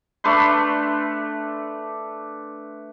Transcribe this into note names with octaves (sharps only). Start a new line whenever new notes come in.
A3 D4 B4 C6